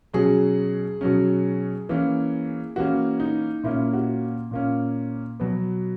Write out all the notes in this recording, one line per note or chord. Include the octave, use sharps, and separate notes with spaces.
B2 F#3 C#4 G#4
B2 F#3 C#4
E3 A#3 C#4
E3 A#3 C#4 F#4
D#4
A#2 A#3 C#4 E4
F#4
A#2 A#3 C#4
B2 F#3 B3